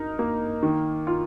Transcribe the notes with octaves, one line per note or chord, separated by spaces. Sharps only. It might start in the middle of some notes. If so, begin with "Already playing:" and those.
Already playing: D#4 A#4
A#3
D#3
F4